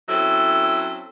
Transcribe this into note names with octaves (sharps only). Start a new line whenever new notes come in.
F#3 C4 C#4 E4 A4